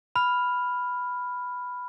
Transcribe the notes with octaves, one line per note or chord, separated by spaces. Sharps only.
B5 F6